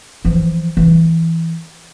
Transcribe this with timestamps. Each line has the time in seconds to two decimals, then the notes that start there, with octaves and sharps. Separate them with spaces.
0.25 E3 F3
0.77 E3